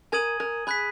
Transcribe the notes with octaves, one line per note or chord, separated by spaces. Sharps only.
A#4 G#5 D#6 G#6 D#7 F#7
A#4
G#4 B5 F#6 B6